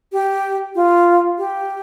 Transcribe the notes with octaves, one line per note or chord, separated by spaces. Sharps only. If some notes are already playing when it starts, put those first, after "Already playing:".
G4
F4
G4